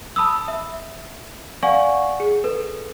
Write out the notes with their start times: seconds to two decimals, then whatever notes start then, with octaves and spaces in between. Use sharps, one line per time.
0.16 A5 B5 D#6 E6
0.48 E5
1.63 D5 F5 F#5 G#5 C#6
2.20 G#4
2.44 A4 B4